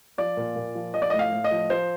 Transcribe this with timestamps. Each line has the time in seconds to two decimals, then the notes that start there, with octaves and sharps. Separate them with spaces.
0.18 F3 D5
0.37 A#2
0.56 A#2
0.75 F3
0.94 F3 D#5
1.02 D5
1.10 A2 D#5
1.19 F5
1.32 A2
1.44 D#5
1.51 F3
1.70 F3 C5